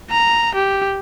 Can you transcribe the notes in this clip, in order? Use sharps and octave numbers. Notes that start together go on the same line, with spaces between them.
A#5
G4